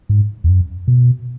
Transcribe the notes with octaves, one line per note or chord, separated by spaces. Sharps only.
G#2
E2
F#2
B2